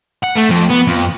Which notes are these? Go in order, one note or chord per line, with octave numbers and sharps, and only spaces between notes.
F#5
A3
F2
B3
F2